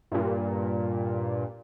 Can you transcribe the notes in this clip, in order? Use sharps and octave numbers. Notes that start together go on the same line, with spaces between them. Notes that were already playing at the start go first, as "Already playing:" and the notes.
G2 A#2